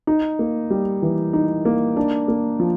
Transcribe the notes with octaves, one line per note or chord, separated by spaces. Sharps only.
D#4
A#3
G3
E3
D#4
A#3
D4
A#3
F3